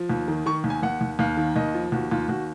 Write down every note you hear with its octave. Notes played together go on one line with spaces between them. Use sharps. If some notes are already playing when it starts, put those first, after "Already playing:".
Already playing: F3
D#2
D#3
D#3 C#6
D#2
G#5
D#2 F#5
D#2
D#2 F5
D#3
D#2 D#5
F3
D#2 F#4
D#2 F4
D#2 F#4